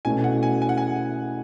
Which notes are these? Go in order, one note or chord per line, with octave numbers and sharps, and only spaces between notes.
B2 A3 C#4 E4 G#5
F#5
G#5
G#5
F#5
G#5